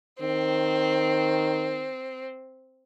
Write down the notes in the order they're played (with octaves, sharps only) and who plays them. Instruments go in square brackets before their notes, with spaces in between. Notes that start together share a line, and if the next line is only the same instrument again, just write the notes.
[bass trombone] D#3 [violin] C4